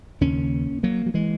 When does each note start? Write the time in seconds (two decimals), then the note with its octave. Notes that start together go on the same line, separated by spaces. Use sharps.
0.21 D#2 C#3 A#3 C#4
0.83 F#3 A#3
1.06 F#3
1.14 E3 G#3